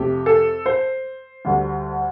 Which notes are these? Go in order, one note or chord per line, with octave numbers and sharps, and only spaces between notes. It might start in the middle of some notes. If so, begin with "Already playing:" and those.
Already playing: F2 C3 A3 G4
A4
C5
D2 D3 G3